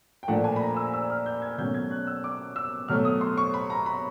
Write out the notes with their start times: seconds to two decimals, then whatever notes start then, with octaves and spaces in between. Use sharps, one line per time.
0.23 G5
0.28 A#2 F3 A3 D4 F#5
0.44 G#5
0.56 B5
0.60 A#5
0.77 E6
0.94 E6
1.10 F6
1.26 G6
1.42 G#6
1.58 B2 F#3 A3 C#4 G6
1.74 G#6
1.91 F#6
2.07 E6
2.24 D6
2.56 E6
2.88 B2 F#3 A3 F6
3.05 D#6
3.21 C6
3.38 C#6
3.54 B5
3.70 A#5
3.86 B5